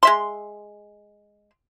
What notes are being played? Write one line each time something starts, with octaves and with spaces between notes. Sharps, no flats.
G#3 E5 C6